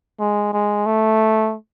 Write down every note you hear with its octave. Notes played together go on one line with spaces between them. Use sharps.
G#3
G#3
A3